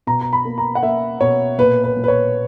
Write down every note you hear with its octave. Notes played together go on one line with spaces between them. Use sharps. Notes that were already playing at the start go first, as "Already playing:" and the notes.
B2 A#5
A#5
B5
A#3
A#5
F#5
A#3 E5
B2 C#5
A#2 B4
B4
A#2
B4
C#5